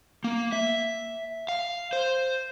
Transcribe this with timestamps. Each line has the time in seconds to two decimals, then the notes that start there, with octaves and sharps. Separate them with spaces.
0.24 A#3
0.53 E5
1.48 F5
1.93 C5